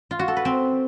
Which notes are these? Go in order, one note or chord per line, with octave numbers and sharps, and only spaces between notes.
F4
F#4
A4
B4
C4